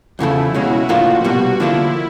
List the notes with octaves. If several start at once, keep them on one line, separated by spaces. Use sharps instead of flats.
E2 C#3 F3 A3 E4
C#2 B2 G#3 C#4 F#4
A2 F3 A#3 D4 F4 F#4
C2 B2 G3 B3 F#4
D3 F3 A#3 D4 E4 F4